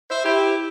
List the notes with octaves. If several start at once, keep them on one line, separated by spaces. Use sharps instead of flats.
C5 E5
E4 G4